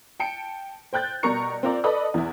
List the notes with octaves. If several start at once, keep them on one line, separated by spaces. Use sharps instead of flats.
G5 A5 C#7 D7
C5 G5 F#6 G6 A6
B2 G3 A#4 A#5 C#6 C#7
C4 F4 A#4 D5
A4 B4 D5 D#5 B5 D#6
E2 E4